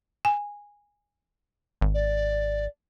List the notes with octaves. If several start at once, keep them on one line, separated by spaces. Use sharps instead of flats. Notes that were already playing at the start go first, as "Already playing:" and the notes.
G#5
G#1
D5